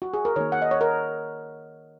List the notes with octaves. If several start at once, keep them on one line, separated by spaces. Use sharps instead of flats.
F#4
G#4
A#4
D#3 A#3 C#5
F#5
D#5
C#5
A#4